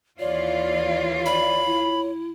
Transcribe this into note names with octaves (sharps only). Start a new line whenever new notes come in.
D#2 E3 F4 C#5 D5
D5 B5
E4